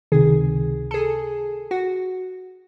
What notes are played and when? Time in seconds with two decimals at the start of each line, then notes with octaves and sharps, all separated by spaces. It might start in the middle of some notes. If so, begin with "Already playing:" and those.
0.12 C#2 C3 D#3 G#4
0.91 A4
0.94 G#4
1.71 F#4